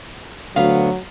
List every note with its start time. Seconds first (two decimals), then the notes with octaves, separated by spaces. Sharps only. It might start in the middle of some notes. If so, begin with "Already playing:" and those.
0.56 D2 F#3 B3 F5